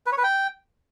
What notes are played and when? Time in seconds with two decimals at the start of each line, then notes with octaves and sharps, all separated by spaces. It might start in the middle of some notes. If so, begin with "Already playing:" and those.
0.06 B4
0.12 C#5
0.18 B4
0.23 G5